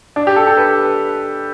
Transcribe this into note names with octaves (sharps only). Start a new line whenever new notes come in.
D4
G4
A4
A4
B4